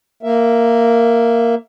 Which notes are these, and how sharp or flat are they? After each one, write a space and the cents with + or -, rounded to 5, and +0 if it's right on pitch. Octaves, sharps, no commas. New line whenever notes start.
A#3 +0 A#4 +0 E5 +10